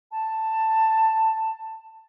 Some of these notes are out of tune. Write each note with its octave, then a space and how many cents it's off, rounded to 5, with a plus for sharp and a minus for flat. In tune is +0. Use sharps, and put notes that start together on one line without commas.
A5 +10